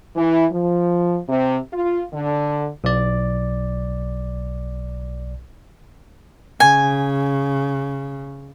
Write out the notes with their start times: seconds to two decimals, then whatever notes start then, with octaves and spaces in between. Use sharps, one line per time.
0.16 E3
0.52 F3
1.28 C3
1.73 F4
2.13 D3
2.84 B1 D5
6.60 C#3 G#5